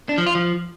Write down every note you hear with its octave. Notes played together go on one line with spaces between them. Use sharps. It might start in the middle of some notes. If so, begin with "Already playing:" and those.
D4
F3
F4
F3